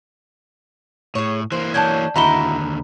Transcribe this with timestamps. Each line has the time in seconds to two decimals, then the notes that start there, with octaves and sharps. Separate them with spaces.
1.15 A2 G#4 C#5
1.52 E3 A#3 C5
1.74 F#3 C#4 D4 A5 G6 G#6
2.16 D#2 D3 D#4 E4 F#4 A#5 B5 G7